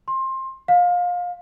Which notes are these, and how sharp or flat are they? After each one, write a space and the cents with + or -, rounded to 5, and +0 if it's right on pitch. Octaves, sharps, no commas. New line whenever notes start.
C6 +20
F5 +25